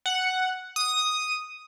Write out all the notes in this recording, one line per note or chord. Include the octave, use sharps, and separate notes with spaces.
F#5
D#6